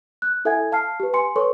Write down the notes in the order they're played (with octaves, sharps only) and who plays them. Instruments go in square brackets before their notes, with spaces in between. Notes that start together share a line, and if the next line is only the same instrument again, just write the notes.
[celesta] F#6
E4 A4 E5 F#5 G#5 G#6
F5 A5 F6 C7
G4 B4
G#5 C6 C#7
A4 B4 C#5 C6 C#6